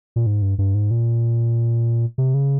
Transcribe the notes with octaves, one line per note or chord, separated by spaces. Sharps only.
A#2
G#2
G2
G2
G#2
A#2
C3
C#3